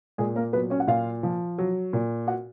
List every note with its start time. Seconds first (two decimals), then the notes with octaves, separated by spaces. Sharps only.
0.18 A#2 G#3 G#4
0.36 A#3 A#4
0.53 F#3 B3 B4
0.70 C#4 C#5
0.80 F#5
0.87 A#2 F4 F5
1.23 F3
1.58 F#3
1.93 A#2
2.27 F#4 F#5